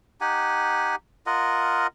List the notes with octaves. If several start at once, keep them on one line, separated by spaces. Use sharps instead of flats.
D#4 G4 F#5 G#5
F4 A#4 D#5 F#5